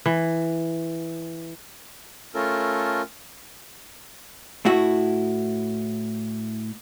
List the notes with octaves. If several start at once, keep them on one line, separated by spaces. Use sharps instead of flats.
E3
A3 C#4 F4 A4 A#4
A2 E4 F#4